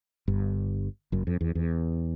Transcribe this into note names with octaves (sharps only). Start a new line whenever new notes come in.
G1 G2
F#1 F#2
F2
E2
E2